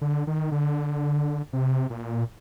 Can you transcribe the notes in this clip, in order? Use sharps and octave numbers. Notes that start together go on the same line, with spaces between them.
D3
D#3
D3
C3
A#2